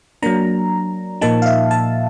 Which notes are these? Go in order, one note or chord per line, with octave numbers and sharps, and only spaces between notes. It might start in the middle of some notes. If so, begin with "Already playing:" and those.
F#3 A#3 D4 A#5
A#2 F3 A#3 D#4 A5
F5
E5
A5